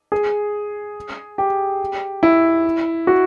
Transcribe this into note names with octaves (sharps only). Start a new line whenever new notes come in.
G#4
G4
E4
F#4